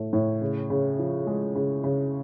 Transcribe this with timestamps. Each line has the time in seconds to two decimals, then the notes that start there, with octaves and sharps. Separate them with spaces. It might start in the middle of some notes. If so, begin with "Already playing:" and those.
Already playing: A2 A3
0.13 A2
0.41 C#3
0.70 C#3
0.99 F3
1.27 G#3
1.55 C#3
1.84 C#3